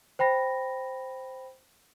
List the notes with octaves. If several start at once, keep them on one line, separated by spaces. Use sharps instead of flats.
C5 G5 B5 A#6